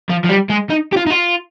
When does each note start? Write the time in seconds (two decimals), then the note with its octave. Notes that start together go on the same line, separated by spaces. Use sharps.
0.09 F3
0.24 F3
0.29 G3
0.50 G#3
0.70 D#4
0.93 G4
0.97 F4
1.06 D#4
1.10 F4